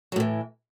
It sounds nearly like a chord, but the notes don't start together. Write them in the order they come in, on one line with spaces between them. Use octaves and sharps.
F#3 A2 E3